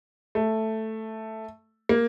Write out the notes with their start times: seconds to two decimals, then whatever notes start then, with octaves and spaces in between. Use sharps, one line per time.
0.35 A3
1.89 A#3